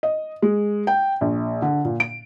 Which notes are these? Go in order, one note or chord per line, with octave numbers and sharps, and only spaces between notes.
D#5
G#3
G5
A#1
D3
A#2
D7